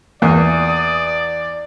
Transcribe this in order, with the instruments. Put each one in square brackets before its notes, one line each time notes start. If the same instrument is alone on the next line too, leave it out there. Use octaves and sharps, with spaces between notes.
[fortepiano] E2 [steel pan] A#3 [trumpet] D5 [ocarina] D#6